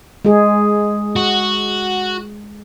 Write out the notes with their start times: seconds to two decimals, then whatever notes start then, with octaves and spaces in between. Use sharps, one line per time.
0.25 G#3 G#4
1.16 F#4